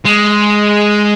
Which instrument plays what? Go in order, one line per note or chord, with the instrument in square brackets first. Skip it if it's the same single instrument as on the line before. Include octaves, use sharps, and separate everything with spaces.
[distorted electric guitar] G#3